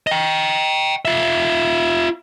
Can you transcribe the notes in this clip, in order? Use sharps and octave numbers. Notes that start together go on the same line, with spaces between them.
D#5 G5
F4 E5